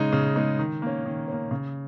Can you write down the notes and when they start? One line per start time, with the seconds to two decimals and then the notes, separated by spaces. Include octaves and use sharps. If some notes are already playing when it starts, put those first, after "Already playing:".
Already playing: C#3 G#3 D#4
0.12 C#3
0.36 G#3 D#4
0.59 D#3
0.82 A#3 C#4
1.05 D#3
1.28 A#3 C#4
1.51 C#3